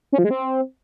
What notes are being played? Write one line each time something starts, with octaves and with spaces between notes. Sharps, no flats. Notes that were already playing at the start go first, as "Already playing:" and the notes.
C#4
F3
G#3
C4